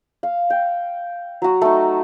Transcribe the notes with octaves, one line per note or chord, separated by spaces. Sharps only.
F5
G5
F#3 F#4
A3 D#4